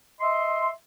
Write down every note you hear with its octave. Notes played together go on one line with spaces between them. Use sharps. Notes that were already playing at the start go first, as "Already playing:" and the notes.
D#5 E5 C6